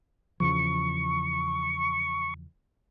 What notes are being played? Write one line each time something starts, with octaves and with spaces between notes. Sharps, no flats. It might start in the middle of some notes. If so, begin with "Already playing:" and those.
E2 C#3 F3 C#6